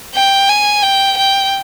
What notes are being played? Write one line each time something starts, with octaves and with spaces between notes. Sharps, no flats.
G5
G#5
G5
G5